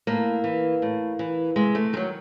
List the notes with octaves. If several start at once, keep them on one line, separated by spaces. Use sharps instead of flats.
A2 A#3
E3
A2
E3
C3 G#3
A3
D#3 F#3 G#3